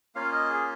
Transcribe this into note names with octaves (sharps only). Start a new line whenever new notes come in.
A#3 C#4 F4 F5
D#5
G#4